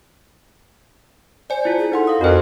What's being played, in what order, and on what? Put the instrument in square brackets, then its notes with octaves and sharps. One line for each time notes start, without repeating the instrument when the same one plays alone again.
[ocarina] C5 [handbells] D5 G#5
[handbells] E4 F4
[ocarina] G#4
[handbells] D#4 F#5 C6 [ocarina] A4
[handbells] F5 D#6
[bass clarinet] F2 [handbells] F#4 C5 [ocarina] A#4